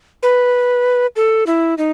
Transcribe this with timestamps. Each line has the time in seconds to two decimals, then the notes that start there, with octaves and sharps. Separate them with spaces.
0.23 B4
1.16 A4
1.47 E4
1.78 D#4